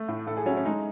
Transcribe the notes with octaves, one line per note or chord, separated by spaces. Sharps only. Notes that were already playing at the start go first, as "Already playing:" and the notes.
Already playing: A3
A2
A2 A4
G#4
F#3 C#4
C#4
G#3 D#4